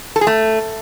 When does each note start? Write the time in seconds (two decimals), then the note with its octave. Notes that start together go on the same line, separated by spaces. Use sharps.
0.16 A4
0.21 G#4
0.27 A3